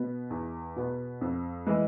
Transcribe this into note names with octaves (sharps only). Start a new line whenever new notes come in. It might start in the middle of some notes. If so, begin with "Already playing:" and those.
Already playing: B2 B3
E2
B2 B3
F2
E3 G#3